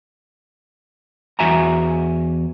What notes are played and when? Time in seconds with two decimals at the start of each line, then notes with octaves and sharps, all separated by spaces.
1.39 E2 F#4 E5 G#5 A#5